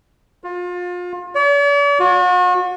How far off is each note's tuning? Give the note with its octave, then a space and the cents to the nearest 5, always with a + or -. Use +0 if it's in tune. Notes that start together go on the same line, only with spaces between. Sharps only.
F4 +30
D5 -45
F#4 -40